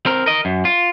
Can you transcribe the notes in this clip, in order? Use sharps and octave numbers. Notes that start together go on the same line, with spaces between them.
C4 A#4
A#4 D#5
F#2
F4